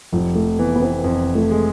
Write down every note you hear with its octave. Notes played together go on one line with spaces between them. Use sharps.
F1 F3
A3
E3 B3
B3
C4
F2 C4
A3
G#3